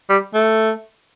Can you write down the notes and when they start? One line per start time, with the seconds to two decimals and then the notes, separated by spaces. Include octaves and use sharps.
0.09 G3
0.34 A3